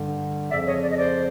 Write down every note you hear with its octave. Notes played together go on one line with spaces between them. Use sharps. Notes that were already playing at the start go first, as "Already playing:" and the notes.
Already playing: G2 D3 G3
F2 C#3 F3 D5 E5
C#5 D#5
D5
D#5
C5 D5